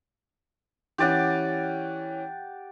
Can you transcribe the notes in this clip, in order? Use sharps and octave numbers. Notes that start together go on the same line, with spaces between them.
E3 C#4 G4 D5 F#5